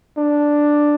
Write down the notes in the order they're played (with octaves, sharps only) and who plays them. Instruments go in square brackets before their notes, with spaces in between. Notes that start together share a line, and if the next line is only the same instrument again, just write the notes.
[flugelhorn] D4